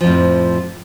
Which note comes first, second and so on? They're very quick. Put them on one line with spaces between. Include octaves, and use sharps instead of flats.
F3 F2 A2